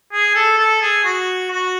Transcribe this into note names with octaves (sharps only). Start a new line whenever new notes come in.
G#4
A4
A4
G#4
F#4
F#4